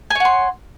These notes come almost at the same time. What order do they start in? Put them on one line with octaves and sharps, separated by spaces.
G#5 C#5 F#5 C6